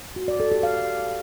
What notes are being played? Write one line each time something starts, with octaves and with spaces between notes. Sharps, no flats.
F#4
D5
A4
G4
F5